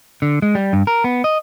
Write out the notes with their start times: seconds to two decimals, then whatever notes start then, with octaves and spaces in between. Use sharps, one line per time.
0.22 D3
0.42 G#3
0.55 G3
0.73 G2
0.87 A#4
1.04 B3
1.24 D#5